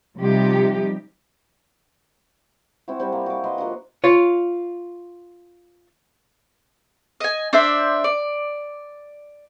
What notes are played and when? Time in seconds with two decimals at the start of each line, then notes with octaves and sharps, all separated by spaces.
0.18 C3 F3 G3 D#4 G4
2.88 C4 E4 F#4
3.00 G3 C4
3.12 A#3
3.26 F#4 D6
3.44 B4 D#5 C6
3.58 F3 A#3 D4 F#4
4.04 F4 C#5
7.20 D#5 G#5
7.53 D4 C5 D5 E5
8.04 D5